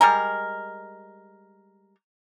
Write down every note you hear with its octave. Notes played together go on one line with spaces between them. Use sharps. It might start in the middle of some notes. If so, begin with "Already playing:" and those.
G3 G#3 A#4